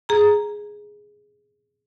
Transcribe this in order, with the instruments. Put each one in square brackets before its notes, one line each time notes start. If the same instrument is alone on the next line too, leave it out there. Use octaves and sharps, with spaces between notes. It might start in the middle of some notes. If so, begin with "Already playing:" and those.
[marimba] G#4 A#5